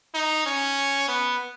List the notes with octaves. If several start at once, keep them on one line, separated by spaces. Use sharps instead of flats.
D#4
C#4
B3